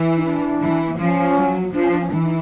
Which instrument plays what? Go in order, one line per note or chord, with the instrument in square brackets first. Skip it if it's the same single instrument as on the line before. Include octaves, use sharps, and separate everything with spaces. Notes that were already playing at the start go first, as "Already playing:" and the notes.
Already playing: [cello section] E3
[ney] D#4
D4
[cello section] E3
[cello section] F3 [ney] C#4
[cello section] F#3
[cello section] F3 [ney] D4
[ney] C#4
D4
C#4
[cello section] E3 [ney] D4
[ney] D#4